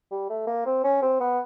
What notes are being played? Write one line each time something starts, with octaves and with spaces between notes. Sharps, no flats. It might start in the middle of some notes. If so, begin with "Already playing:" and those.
G3
A3
A#3
C4
C#4
C4
B3